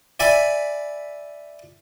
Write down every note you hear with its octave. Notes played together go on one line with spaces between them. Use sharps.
D5 E5 G#5 B5